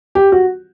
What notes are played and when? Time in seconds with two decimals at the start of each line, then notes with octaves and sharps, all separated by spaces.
0.15 G4
0.32 F#4